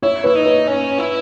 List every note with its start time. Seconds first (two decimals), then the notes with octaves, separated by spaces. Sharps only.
0.03 E4 C#5
0.24 E4 B4
0.35 D#4
0.45 B4
0.67 C#4
0.98 E4